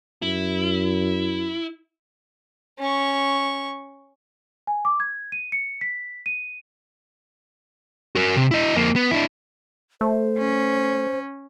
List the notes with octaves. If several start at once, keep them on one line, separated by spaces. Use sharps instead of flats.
F#2 E4
C#4 C#6
G#5
D6
G#6
D#7
C#7
B6
D#7
F#4 A#4
C3
E4 D#5
F2 A#3
B3
D4 E4
A3 C5
C#4